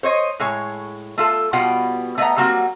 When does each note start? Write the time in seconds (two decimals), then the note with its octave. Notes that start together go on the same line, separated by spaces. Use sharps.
0.03 C5 C#5 D#5
0.40 A2 G#3 C#5
1.18 A3 F4 A4
1.53 B2 G3 F4 F#5 G5
2.18 A3 B3 D#5 F5 F#5 A#5
2.37 F#3 G3 A#3 C4 F#4